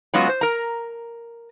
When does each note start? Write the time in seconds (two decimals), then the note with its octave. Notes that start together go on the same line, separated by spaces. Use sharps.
0.14 F#3 G#3 B3 C#4 F4 F#4
0.29 C5
0.41 A#4 A#5